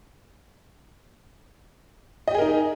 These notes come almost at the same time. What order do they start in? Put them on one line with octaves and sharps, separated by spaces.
D#5 G4 G#4 A#4 D#4